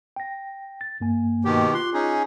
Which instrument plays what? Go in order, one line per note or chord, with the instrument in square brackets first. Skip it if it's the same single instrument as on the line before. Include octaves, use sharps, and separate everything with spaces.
[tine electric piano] G5 A#6
A6
G2 A#3 G#5
[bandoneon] B2 D#3 G4
[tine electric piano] F4 D6 F#6 [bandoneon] C6
[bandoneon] C#4 D#4 G#4